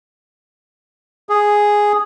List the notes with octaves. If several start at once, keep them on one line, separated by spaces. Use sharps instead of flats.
G#4